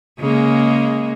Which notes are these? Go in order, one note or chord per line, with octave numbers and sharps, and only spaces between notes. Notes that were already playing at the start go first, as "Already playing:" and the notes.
C#3 G#3 A#3